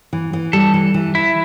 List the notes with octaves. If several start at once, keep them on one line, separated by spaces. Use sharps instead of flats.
E3
E3
G3 A4
E3
E3
E3 E4